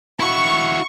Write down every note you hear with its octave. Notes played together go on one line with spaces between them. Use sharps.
E4 F#4 C#6